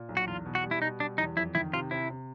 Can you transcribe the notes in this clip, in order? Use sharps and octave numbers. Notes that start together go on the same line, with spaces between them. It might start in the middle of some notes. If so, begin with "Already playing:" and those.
Already playing: A#2
B1
F#4
E2 F4
B2
F#4
G3
E4
B2 D#4
G3 D4
E2 D#4
F2 E4
D#3 E4
C3 F4
C3 E4
C3